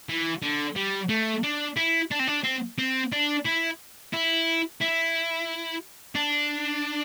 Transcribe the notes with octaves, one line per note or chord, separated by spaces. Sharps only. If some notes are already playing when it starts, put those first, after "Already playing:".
E3
D3
G3
A3
D4
E4
D4
C4
D4
C4
C4
D4
E4
E4
E4
D4